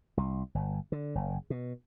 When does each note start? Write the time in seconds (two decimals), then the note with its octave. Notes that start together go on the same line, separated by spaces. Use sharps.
0.17 C2
0.55 G1
0.92 D3
1.15 F#1
1.50 B2